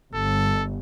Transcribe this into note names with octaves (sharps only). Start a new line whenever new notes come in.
G1 A4